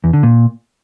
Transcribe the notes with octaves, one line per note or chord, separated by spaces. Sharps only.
E2
D3
A#2